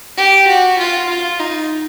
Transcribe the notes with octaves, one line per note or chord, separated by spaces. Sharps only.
G4
F#4
F4
F4
D#4